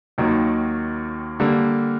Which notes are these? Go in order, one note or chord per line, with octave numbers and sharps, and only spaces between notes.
D#2 D#3 F#3 A#3
D3 G3 A#3